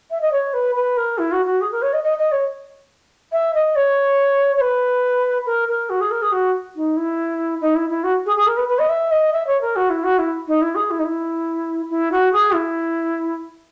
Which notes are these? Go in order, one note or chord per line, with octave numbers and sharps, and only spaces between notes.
E5
D#5
C#5
B4
B4
A#4
E4
F#4
F#4
G#4
A#4
C#5
D#5
D#5
D#5
C#5
E5
D#5
C#5
C#5
B4
A#4
A#4
F#4
G#4
A#4
G#4
F#4
D#4
E4
D#4
E4
E4
F#4
G#4
G#4
A#4
B4
B4
D#5
E5
D#5
E5
C#5
A#4
F#4
E4
F#4
E4
D#4
E4
G#4
E4
D#4
E4
E4
F#4
G#4
E4